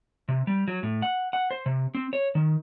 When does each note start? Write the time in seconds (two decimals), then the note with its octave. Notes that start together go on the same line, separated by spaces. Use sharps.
0.29 C3
0.47 G3
0.68 F#3
0.83 A2
1.02 F#5
1.33 F#5
1.51 C5
1.66 C3
1.95 C4
2.13 C#5
2.35 D#3